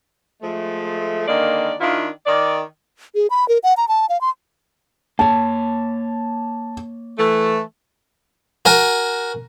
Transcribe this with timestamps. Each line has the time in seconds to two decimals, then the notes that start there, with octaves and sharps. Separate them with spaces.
0.42 F3 G#3 A3
1.28 D3 D#3 G#3 A#3 D5
1.81 D#3 D4 E4 F4
2.26 D#3 D5
3.15 G#4
3.30 B5
3.49 A#4
3.63 F#5
3.77 A#5
3.88 A5
4.09 F5
4.21 C6
5.19 A#3 C#5 A5
7.18 E3 A3
8.65 F#4 A#4 G#5